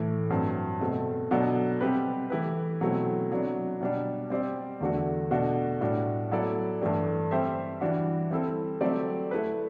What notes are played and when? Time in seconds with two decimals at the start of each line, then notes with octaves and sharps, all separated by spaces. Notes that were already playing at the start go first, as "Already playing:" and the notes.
Already playing: A2 E3 A3
0.30 G2 F#3 C4
0.81 B2 A3 C4
1.31 B2 F#3 B3 D4 A4
1.81 C3 G3 C4 G4 B4
2.30 E3 A3 E4 G4 B4
2.81 B2 F#3 A3 C4 E4
3.31 C3 F#3 B3 D4
3.81 B2 G3 D4
4.30 G3 C4 G4 D5
4.81 E2 D3 A3 D4 F#4
5.31 B2 A3 D4 F#4
5.81 A2 G3 D4 F#4
6.31 F#3 B3 E4 A4 D5
6.81 G2 E3 A3 D4 G4
7.31 G3 C4 G4 C5 E5
7.81 E3 G3 D4 F#4
8.31 G3 C4 E4 A4
8.81 F#3 A3 C4 G4 D5
9.31 A3 E4 B4